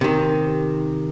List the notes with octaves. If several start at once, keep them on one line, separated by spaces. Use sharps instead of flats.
C3 D#3